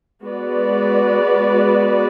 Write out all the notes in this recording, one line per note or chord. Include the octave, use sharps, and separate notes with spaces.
G#3 B3 F#4 B4 D5